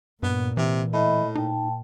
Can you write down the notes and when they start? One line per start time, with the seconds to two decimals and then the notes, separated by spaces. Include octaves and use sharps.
0.23 G2 A#2 B3
0.57 C3 E3
0.93 A2 D#5 E5 B5
1.35 A#2 D#4 G5 A5